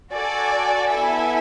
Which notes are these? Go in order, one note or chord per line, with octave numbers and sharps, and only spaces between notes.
F#4 A4 D5 G#5
B3 E4 A4 E5 G#5